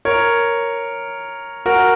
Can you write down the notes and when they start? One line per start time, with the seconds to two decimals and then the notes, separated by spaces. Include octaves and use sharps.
0.05 A#4 C#5
1.66 F#4 A#4